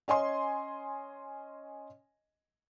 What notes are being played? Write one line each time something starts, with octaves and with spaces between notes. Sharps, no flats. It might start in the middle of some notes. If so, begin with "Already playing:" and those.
C#4 D#5 G#5 C6